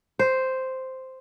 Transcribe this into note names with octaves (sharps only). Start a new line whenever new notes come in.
C5